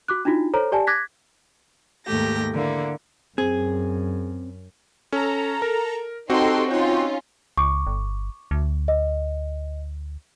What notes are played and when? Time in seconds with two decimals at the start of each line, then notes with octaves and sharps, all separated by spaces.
0.08 F#4 D6 F#6
0.25 D4 D#4 F4 F#4
0.54 A4 C5 C#5 A#5
0.72 G4 D5 G#5 A5
0.87 D6 F#6 G#6 A#6 B6
2.06 D#2 G#2 A3 G4 A#6
2.53 D3 A#3 E4
3.38 F#2 C4 G#4
5.12 C#4 A4 A#5
5.62 A#4
6.30 C4 D#4 F#4 G4 A4 G5 C6
6.70 C#4 D#4 F4 G5 C6
7.57 C#2 C#6 D6
7.87 G1
8.51 D2
8.88 D#5